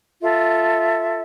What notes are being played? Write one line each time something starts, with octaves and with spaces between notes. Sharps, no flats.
F4 A4 E5